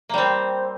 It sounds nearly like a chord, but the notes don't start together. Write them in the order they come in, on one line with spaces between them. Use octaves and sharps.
A#3 G3 C4